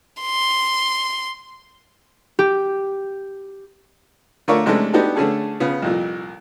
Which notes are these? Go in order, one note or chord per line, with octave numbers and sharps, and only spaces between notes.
C6
G4
D3 A3 F4 A#4 C#5 D5
C3 G#3 A3 C#4 D4 A4
B3 D4 D#4 F#4 G4 A4
D3 A3 C#4 G#4 A4
C#3 F3 B3
C2 F2 A#2